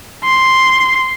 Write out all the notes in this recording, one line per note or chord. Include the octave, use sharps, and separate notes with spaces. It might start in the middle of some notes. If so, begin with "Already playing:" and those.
C6